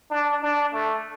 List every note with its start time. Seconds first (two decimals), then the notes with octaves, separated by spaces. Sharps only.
0.11 D4
0.43 D4
0.73 A3